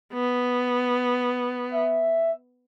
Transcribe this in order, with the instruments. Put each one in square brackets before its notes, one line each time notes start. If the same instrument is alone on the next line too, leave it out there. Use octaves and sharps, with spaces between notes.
[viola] B3
[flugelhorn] E5